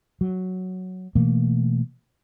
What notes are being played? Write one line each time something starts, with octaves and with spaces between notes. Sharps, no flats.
F#3
B2 E3 A3 A#3